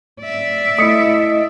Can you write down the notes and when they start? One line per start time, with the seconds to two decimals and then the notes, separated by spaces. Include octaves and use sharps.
0.21 D5 E5
0.79 A3 E4 D#5 D#6 C#7